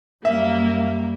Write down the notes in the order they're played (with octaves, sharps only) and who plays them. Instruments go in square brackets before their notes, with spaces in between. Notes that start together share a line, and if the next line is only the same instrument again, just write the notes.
[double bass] F#2 G3 [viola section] A#3 [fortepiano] E5